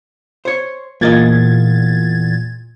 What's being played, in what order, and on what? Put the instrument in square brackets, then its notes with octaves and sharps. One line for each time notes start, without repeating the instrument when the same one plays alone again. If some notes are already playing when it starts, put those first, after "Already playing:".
[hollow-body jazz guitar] C5 C#5
[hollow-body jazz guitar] E2 A#3 D#5 [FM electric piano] A#2 G#6 A6